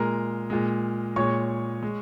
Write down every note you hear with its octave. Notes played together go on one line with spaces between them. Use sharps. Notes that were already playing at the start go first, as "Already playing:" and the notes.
Already playing: A#2 G#3 A#4 A#5
A#2 G#3
A#2 G#3 C#5 C#6
G#3